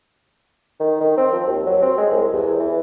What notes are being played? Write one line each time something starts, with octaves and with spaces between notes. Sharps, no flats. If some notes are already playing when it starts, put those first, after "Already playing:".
D#3
D#3
C4
F3
D#2
F#3
C4
G#3
C2
E2
E3